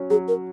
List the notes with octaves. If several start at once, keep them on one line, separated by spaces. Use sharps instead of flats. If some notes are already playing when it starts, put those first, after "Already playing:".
Already playing: F#3 C#4
F#3 G#4
A#4